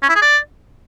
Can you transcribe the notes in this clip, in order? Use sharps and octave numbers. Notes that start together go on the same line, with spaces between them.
C#4
E4
G#4
D5